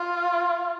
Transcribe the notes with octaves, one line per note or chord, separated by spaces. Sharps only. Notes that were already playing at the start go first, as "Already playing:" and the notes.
Already playing: F4